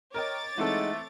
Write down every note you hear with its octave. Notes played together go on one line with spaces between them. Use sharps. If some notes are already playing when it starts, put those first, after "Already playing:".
A#4 C#5 D#5 G5 D6 A6
E3 G#3 A3 C4 D#4 A4 F#5